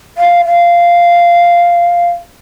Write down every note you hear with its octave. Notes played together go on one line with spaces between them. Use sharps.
F5
F5